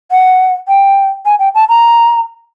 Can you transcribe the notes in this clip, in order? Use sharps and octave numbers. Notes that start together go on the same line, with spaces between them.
F#5
G5
G#5
G5
A5
A#5